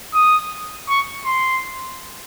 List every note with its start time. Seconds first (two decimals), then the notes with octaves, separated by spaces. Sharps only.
0.14 D#6
0.89 C#6
1.26 C6